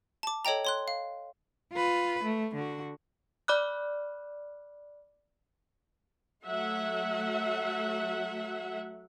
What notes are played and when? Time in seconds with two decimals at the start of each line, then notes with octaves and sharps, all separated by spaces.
0.23 A5 D6
0.45 A4 C#5 D#5 G5 A#5
0.65 C#5 C6 F#6
0.88 F5
1.73 F4 B4
2.24 A3
2.55 D3 F#4
3.48 D5 B5 D6 F6 F#6
6.44 F#3 A3 E5 F#5